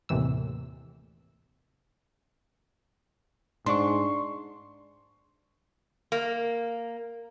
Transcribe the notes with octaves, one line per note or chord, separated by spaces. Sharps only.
D#2 A2 C3 E3 E6
G#2 D4 C6 C#6
A#3